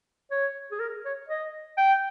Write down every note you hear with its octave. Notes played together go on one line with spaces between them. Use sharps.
C#5
G#4
A#4
C#5
D#5
G5